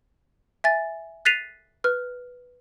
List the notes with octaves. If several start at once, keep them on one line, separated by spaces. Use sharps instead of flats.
E5 G#5 A6
F#6 A6 B6 C7 D#7 F7
B4 F6